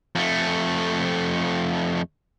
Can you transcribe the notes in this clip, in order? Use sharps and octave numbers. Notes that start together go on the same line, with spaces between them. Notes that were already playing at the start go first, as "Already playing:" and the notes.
F2 A3